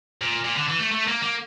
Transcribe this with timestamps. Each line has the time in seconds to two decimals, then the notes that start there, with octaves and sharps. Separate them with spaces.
0.21 A#2
0.44 A#2
0.56 D3
0.69 E3
0.80 A3
0.91 A3
1.08 A#3
1.22 A#3